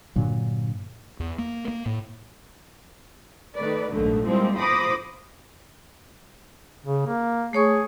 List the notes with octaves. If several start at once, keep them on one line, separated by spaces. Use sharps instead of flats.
G2 A#2 D3 F#3
E2
A#3
A#3
A2
D#3 A3 B4 D5
A#1 D#2 G#2 D3 F#3 A3
F3 G3 G#3 A#3 C4 E4
F3 C5 B5 D6 D#6 A#6
C#3
A#3
A3 G#4 C#5 C#6